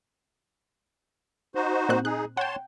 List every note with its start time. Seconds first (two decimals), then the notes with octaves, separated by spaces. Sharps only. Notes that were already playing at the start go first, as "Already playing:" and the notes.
1.55 D#4 F#4 C5
1.89 A#2 C4 F#6
2.05 D#4 G#4 F#6
2.37 C#5 F#5 G5 A5 C6